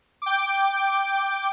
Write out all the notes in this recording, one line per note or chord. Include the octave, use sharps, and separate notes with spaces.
G5 D6